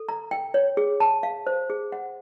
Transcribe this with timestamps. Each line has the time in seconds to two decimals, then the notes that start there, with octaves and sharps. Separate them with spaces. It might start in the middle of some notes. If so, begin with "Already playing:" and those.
Already playing: A4
0.09 A#5
0.31 G5
0.54 C#5
0.77 G#4
1.00 A5
1.23 F5
1.47 C5
1.70 G#4
1.92 F#5